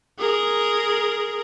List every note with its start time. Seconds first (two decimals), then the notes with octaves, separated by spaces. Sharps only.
0.19 G#4 A#4